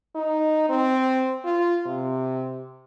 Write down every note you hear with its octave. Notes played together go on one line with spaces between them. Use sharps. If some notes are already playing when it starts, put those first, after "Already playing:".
D#4
C4
F4
C3